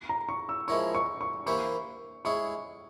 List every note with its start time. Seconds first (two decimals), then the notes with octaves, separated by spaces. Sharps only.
0.09 A#5
0.29 C#6
0.49 E6
0.68 F3 G#3 E4 A#4 C#5 C#6
0.95 C#6
1.21 C#6
1.46 E3 A#3 E4 G4 C5 C#6
2.25 G#3 E4 G#4 C#5 C#6